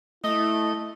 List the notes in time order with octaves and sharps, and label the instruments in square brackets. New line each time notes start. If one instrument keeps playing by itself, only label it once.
[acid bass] A3 [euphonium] E4 [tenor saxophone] D#5